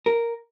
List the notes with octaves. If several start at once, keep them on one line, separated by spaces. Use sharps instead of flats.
A#4